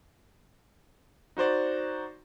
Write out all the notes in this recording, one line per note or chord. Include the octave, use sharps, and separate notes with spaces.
D#4 F#4 C5 D5